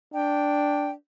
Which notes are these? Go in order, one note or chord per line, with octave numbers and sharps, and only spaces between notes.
D4 G5